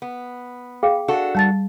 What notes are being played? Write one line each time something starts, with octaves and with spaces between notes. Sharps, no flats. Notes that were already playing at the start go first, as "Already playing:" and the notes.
B3
G#4 F5 G5
D4 F#4 A4
G3 A5 A6